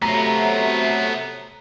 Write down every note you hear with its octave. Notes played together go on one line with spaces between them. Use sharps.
C3 F#3 A3 B3 F4 A#5